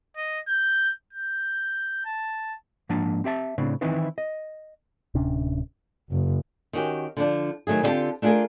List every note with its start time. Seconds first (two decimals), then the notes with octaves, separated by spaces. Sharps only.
0.17 D#5
0.48 G6
1.13 G6
2.05 A5
2.89 G#2 F3 A#3 D4 A5
3.24 C4 G4 E5 A5
3.58 A2 C#3 C4 D4
3.81 D#3 E3 C4 D#4 E4 B4
4.18 D#5
5.15 D1 C3 C#4 D4
6.11 F#1
6.73 D#3 C#4 F#4 G4
7.17 D3 F3 D4
7.67 D#3 F#3 A3 G#4
7.83 D3 G3 C4 F4 G4 A5
8.22 A3 D4 F4 G4 G#4 A#4